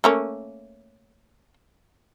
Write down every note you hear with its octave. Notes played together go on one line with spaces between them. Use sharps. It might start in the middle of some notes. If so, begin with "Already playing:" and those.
A3 A#3 C#4